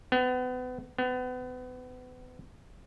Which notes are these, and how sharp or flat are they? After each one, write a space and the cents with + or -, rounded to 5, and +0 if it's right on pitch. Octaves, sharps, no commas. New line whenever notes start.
B3 +35
B3 +35